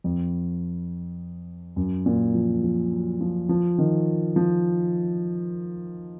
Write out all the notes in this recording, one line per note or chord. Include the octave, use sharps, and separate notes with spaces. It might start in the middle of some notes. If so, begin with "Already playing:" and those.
F2
F#2
A#2
F3
F3
F#3
F3
F3
D#3
F3